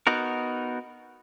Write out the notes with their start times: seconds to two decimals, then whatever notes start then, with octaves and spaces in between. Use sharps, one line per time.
0.07 B3 D#4 F#4 A#4